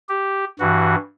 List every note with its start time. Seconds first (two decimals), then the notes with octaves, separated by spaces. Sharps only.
0.09 G4
0.59 G2 E3 F#4